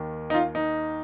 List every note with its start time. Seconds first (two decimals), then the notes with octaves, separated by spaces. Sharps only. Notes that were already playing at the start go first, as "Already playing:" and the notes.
Already playing: D#2 D#3
0.30 D#4
0.34 F4
0.55 D#4